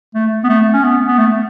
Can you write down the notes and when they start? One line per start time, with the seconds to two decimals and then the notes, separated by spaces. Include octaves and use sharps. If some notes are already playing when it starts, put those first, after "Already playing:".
0.15 A3
0.44 B3
0.49 A3
0.74 C#4
0.84 B3
1.08 B3
1.18 A3